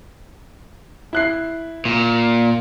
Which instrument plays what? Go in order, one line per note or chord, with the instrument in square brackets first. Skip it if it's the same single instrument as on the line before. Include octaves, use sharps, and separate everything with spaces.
[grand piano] E4 F#6 C7
[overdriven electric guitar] A#2